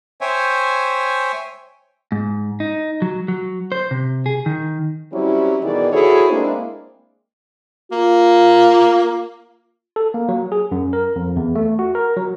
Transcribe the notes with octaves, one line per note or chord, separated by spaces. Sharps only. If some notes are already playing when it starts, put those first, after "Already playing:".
C5 C#5 E5 G5 G#5
G#2
D#4
F#3
F#3
C5
C3
G#4
D#3
F#3 G3 C4 C#4 E4
B2 D#3 E3 G#4 D5
E4 F#4 G#4 A4 C5 C#5
G#3 A#3 C4 D4 E4
A#3 F4
A4
A#3
F#3
G#4
F#2
A#4
F2
E2
A3
F#4
A#4
F#3